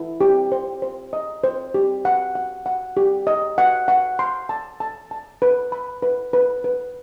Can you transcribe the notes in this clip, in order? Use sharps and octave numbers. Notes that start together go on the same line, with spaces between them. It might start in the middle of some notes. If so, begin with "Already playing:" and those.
Already playing: E4
G4
C5
C5
D#5
C5
G4
F#5
F#5
F#5
G4
D#5
F#5
F#5
C6
A5
A5
A5
B4
B5
B4
B4
B4